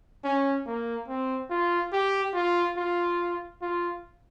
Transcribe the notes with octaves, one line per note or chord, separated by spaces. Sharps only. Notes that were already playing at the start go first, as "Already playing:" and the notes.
C#4
A#3
C4
F4
G4
F4
F4
F4